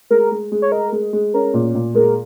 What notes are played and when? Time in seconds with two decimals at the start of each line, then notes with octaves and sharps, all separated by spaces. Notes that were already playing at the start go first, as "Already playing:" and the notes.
0.10 G#3 A#4
0.31 G#3
0.52 G#3
0.62 C#5
0.72 A#4 D#5
0.92 G#3
1.13 G#3
1.34 C#4 A#4
1.54 A#2
1.74 A#2
1.95 G#3 A#4